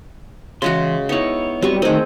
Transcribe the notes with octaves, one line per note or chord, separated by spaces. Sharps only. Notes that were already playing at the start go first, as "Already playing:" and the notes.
C#3 E3 G#3 F#4 C6
B3 D#4 E4 C#5
F#3 G3 B3 C4 C#6
D#3 A3 C4 G#4 D#5